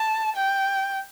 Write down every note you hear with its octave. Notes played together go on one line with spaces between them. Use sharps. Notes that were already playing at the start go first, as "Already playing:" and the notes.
Already playing: A5
G5